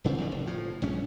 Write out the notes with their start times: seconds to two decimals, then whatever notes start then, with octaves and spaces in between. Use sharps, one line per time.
0.04 D#1 C#3 B3 C4
0.18 E2 D3 D#3
0.32 F1
0.47 A2 F3
0.82 A#1 G2 C#4